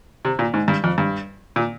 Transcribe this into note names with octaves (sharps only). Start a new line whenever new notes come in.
C3
A#2
G#2
G2
F2
G2
A#2